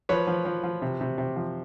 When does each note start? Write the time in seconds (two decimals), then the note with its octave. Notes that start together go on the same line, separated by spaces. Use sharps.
0.09 F3 B4 C#5
0.27 F3
0.45 F3
0.63 F3
0.82 C3
1.01 C3
1.18 C3
1.36 F3